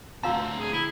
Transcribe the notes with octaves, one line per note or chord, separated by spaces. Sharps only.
D2 C4 F#4 F5 A5 A#5 E6
G#4
E4